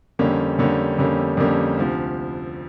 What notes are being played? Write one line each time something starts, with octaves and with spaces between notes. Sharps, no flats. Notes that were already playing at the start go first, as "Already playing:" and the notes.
F2 D3 G3 A#3 C#4
F2 D3 G3 A#3 C#4
F2 D3 G3 A#3 C#4
F2 D3 G3 A#3 C#4
D2 C3 F3